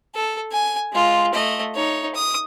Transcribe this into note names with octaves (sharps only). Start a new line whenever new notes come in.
A4
G#5
G#3 F4
A3 D#5
D#4 C#5
D#6